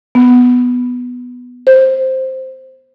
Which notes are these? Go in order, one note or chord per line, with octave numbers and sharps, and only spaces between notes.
B3
C5